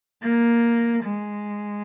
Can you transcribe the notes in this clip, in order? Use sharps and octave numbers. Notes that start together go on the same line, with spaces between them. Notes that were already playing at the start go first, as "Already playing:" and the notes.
A#3
G#3